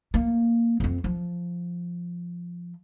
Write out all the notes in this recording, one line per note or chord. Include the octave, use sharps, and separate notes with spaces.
A#3
F2 C4
F3